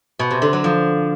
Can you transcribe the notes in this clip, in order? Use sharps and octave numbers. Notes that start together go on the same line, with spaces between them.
B2
C3
D3
F#3
F3